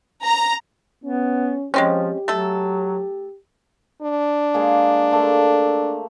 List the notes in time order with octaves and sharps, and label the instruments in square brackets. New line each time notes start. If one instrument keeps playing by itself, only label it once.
[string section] A#5
[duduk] B3 [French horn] C#4
[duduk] F3 [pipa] G#3 C4 C#4 [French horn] G4
[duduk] F#3 [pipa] A3 A4
[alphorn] D4
[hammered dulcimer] G#3 A#3
A3 A#3 C6